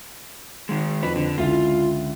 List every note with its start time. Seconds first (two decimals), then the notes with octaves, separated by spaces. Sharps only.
0.69 D#3 G#3
1.03 F2 B4
1.16 D3
1.38 C#2 D3 E4 F4